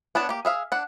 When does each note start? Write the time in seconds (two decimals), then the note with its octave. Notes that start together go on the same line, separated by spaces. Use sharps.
0.15 B3 D4 C#5 A5
0.29 A#3 G4
0.45 G#4 E5 F5
0.72 D4 F#5